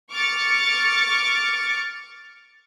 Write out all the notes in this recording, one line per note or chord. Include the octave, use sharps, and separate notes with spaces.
C#6 D6 F6 A6 C#7